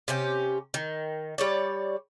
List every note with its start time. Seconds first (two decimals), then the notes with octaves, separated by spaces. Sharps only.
0.08 C3 C#4 G4
0.74 D#3
1.38 G3 C#5 D5